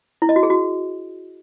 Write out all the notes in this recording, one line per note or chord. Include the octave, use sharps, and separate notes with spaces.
E4
D#5
F#4
G#4
F#4